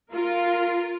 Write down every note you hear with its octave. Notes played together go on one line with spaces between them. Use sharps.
F4 A#4